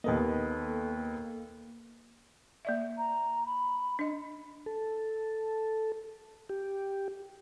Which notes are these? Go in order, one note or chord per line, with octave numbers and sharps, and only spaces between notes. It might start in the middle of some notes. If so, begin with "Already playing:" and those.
D#2 A#3 B3 A4 D#5
A#3 D5 E5
A#5
B5
D4 D#5
A4
G4